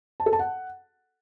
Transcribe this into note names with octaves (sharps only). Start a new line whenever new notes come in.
A5
A4
A5
F#5